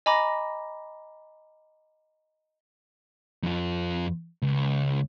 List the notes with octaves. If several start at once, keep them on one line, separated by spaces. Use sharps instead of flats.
D#5 G#5 A#5 B5 D6 A#6
F2 F4
C#2